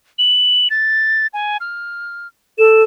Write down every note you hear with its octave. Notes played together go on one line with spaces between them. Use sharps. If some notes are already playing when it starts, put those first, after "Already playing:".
F#7
A6
G#5
F6
A4 E7